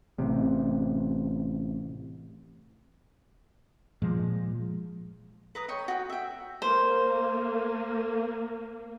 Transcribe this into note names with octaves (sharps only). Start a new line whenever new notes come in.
A1 C3
A#2 F3 G#3
B4 A#5 D#6
C#5 D#5 G5 C#6
F#4 G5
E5 G5
A#3 C5